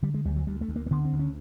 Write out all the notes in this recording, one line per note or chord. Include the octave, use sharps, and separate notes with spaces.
D3 G3
G#3
D2 G3
F#3
D2 G3
A3
D2
A#3
A#3
D3 B3
C4
D2
C#4